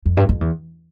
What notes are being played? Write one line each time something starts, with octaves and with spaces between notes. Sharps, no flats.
F2
G2
F2
E2